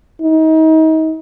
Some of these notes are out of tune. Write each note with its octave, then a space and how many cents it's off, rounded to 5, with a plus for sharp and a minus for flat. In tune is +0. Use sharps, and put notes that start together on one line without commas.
D#4 +30